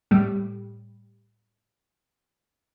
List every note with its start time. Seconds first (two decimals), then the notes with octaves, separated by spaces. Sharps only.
0.11 A2 G3